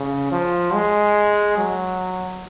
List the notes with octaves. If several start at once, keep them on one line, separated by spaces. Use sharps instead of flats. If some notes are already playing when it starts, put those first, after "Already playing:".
Already playing: C#3
F3
G#3
F#3